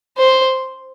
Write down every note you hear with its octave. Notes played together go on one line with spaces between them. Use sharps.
C5